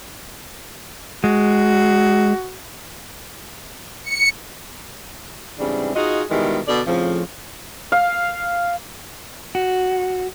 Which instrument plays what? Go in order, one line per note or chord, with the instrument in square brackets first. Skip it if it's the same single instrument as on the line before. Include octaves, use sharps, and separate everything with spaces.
[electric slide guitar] G#3 [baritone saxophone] F#4
[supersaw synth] C#7
[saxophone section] G#2 C#3 E3 G3 C4 D4
D#4 F4 F#4 G#4 D#5
B2 D#3 E3 G3 G#3
B2 D3 D4 D5
F2 A2 C#3 F3
[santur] F5
[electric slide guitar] F#4